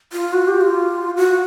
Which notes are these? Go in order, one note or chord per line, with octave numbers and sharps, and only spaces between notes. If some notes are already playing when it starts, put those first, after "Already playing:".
F4
F#4
G4
F4
F#4